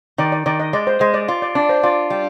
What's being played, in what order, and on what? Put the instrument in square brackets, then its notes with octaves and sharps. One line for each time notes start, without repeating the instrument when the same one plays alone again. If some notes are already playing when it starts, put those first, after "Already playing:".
[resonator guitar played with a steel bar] D#3 [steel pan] D5
[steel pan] D5
[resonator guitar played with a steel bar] D#3 [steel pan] D5
[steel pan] D#5
[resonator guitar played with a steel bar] G#3 [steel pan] D5
[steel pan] C5
[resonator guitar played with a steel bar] G#3 [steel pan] C5
[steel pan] D5
[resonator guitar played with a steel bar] F4 [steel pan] D5
[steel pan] D5
[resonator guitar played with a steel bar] D4 [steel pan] D5
[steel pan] C5
[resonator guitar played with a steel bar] F4 [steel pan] D5
[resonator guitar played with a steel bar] G3